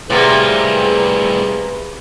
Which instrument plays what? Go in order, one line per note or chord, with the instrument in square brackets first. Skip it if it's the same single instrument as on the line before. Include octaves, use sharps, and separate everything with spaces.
[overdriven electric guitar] A2 G3 [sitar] C3 A#3 B3 [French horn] G#4 [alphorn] B4